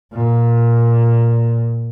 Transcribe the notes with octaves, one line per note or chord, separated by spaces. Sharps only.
A#2